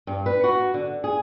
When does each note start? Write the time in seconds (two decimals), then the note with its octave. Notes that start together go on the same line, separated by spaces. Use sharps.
0.07 G2
0.26 B4
0.44 F#4
0.74 D3
1.04 G#4